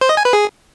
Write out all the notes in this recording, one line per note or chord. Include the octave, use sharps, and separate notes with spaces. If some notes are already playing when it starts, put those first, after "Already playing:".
C5
D#5
G#5
B4
G#4